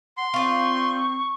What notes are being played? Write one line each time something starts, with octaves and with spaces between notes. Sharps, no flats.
F#5 C6
C4 F4 D5 C#6